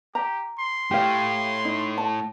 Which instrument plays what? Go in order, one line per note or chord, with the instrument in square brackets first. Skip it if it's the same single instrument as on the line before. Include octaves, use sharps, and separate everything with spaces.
[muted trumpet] G4 [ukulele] A#5
[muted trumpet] C6
[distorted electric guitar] A2 [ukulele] G4 F5
[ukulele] D#4
A5